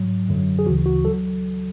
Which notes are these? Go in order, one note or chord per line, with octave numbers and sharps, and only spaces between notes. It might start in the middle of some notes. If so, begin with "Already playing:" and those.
Already playing: G#2 F#3
F#2 D3 F#3
G#4
D2 C#3 E3 F#4
F#4
F#3 A4